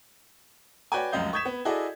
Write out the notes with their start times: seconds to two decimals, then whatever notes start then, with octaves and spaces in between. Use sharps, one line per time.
0.92 F#4 B4 C#5 D5 G5 G#5
1.12 F1 C#2 F#2 D#5 F5 G6
1.33 C#6 D#6 G6 G#6 B6 E7
1.45 B3
1.65 E4 F#4 G#4 A4 D5 D#5